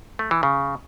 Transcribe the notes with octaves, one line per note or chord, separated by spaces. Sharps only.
A3
E3
C#3